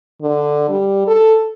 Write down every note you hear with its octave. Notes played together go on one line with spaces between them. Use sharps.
D3
G3
A4